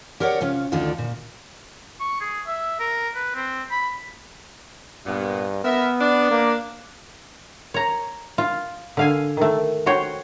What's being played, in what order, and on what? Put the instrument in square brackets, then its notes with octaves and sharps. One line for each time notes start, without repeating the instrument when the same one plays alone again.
[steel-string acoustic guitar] G4 A#4 C#5 D5 F#5
C3 C#4 F4
D2 D3 D#3 D4 F4 A4
A#2
[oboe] C#6
G#4
E5
A#4
B4
C4
B5
[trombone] G2 [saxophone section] A#2 B3
[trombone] B3 [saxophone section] A#4 E5
[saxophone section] D4
[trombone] A#3
[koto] C#5 A#5
F4
D3 F5 G#5
D#3 A3
F#4 C5 C#5 G5